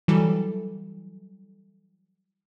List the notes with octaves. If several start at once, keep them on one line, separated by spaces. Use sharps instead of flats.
E3 F#3 G3 A4